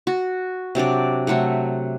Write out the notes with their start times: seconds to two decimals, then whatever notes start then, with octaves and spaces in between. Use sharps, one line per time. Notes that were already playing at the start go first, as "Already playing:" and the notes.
0.07 F#4
0.75 C3 F#3 D4 D5
1.27 C3 F#3 A3 F#5